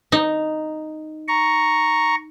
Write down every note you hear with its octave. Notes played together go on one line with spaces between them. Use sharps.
D#4
A#5 C#6